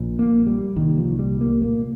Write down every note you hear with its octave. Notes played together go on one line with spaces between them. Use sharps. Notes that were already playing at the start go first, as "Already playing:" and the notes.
Already playing: A#1 A#2
A#3
G3
C2 A#2 D#3
F3
G3
A#3
C2 A#2 A#3